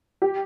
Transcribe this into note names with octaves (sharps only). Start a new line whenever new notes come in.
G4